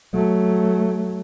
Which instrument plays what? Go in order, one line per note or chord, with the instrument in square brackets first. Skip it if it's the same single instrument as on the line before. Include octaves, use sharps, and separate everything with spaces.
[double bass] F#3 A3